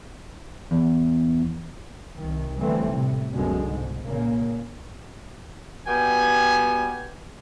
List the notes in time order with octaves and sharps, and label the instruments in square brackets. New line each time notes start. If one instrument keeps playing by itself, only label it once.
[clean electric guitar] E2
[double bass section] C2 D#3
D3 E3 G3 A3 C4
A2 C3
C2 F#2 B2 D3 G#3
G#2
A#2 C#3 A#3
[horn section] G3 B3 F#4 G5 G#5